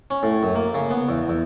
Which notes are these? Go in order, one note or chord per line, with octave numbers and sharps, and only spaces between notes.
C#4
A2
F#2
A#3
C#3
B3
E2
E2